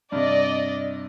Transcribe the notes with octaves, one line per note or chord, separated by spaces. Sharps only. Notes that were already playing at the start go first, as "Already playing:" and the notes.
G2 C3 D5 D#5